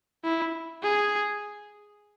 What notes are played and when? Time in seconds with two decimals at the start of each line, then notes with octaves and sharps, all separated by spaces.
0.24 E4
0.83 G#4